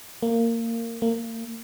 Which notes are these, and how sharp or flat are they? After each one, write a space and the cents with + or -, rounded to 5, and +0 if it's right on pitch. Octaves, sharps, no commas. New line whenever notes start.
A#3 -20
A#3 -30